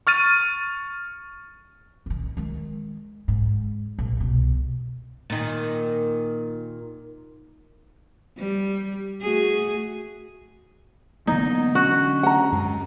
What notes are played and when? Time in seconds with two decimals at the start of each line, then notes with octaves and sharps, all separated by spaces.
0.07 C#6 F6 A6 D#7
2.06 D#1 D#3
2.37 D#3 G#3
3.28 G#2
3.99 A#1
4.20 C2 B2
5.30 A#2 D#3
8.37 G3
9.21 A3 F#4 G#4
11.27 D3 E3 F#3 A#3 B3 D#4
11.75 C#4 D4 F#4
12.23 F#5 A#5
12.52 F#2 G#3